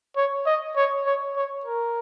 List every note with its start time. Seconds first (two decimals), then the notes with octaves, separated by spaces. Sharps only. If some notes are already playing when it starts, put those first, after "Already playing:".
0.16 C#5
0.46 D#5
0.76 C#5
1.06 C#5
1.36 C#5
1.65 A#4